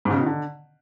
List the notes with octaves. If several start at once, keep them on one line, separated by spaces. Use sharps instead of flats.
G#2
C#3
B2
D#3
D3